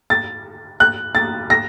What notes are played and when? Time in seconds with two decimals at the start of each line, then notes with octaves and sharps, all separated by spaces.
0.10 A6
0.80 F#6
1.15 A6
1.50 A#6